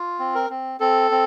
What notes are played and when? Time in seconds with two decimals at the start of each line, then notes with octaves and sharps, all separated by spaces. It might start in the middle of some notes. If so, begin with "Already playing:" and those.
Already playing: F4
0.19 C4
0.35 A#4
0.50 C4
0.80 C4 A4
1.11 C4